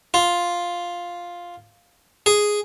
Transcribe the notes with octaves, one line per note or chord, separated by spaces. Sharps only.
F4
G#4